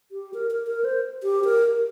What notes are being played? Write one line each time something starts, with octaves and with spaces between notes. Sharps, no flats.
G4
A#4
A#4
A#4
C5
G4
A#4